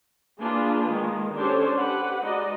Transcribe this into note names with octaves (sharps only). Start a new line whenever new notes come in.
A#3 D4 F4 G#4 B4
D#3 G#3
C#4 D4 G4 A4 C5 C#5
G4 B4 F#5
G#3 D#4 F#4 D5 D#5